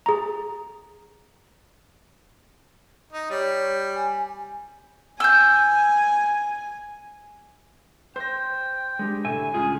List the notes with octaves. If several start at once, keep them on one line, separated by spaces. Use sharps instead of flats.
G#4 A#5
D#4
G3 C#5
G#5
G#5 E6 G6
C5 G5 G6 A#6
G#3 D4 G4
A2 D3 E5 G#5
C#2 C#3 F4 G#4